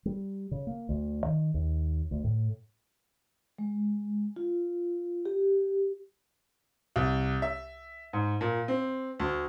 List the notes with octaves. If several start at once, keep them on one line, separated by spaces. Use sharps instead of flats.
G3
C#3
A#3
D2
D#3
D#2
D2
A2
G#3
F4
G4
C2
E5
G#2
A#2
C4
D2